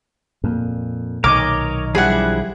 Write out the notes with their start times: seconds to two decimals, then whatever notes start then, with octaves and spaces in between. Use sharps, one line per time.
0.44 F2 A#2
1.24 B1 D#3 A#4 C#5 D#5 D6
1.95 F3 G3 D4 E4 G#4 F#5